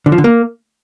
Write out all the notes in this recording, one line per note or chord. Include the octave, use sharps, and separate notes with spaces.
D3
F3
D3
A#3